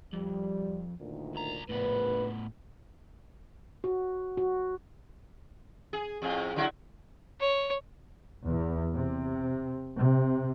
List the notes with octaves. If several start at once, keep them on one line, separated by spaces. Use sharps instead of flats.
F2 G3
D2 A#2 D#3
C2 A#5
A#1 A2 B3 B4
F#4
F#4
G#4
F2 A2 G#4
D3 F#3 E4
C#5
E2
C3
C3